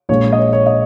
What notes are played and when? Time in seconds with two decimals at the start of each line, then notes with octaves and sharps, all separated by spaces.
0.09 A#1 A#2 G#3 C#5
0.32 D#5
0.38 C#5
0.53 C#5
0.66 D#5